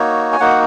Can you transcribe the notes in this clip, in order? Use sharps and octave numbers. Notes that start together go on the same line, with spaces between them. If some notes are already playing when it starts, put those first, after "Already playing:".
Already playing: A#3 D#4 F#4 C#5
G#5
A#3 D#4 F#4 F#5